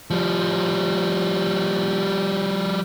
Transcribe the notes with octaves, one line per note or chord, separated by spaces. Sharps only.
F3 G3